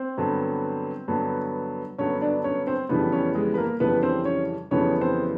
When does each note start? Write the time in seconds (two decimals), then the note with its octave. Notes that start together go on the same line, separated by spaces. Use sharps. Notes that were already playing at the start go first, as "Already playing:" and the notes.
Already playing: C4 C5
0.17 G2 D3 F#3 B3
1.08 G2 D3 F#3 B3
1.98 G2 D3 F#3 B3 C#4 C#5
2.22 D4 D5
2.44 C#4 C#5
2.67 C4 C5
2.89 F2 C#3 E3 G3 B3 B4
3.12 C#4 C#5
3.35 G#3 G#4
3.54 B4
3.57 A#3 A#4
3.80 F2 C#3 E3 G3 B3 B4
4.03 C4 C5
4.25 C#4 C#5
4.71 F2 C#3 E3 G3 B3 C#4 C#5
5.01 C4 C5